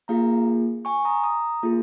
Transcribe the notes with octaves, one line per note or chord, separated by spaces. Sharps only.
A#3 F4 G#4 F5 A#5
G#5 C#6
A#5 D#6
A#5 D#6
A#3 F4 G#4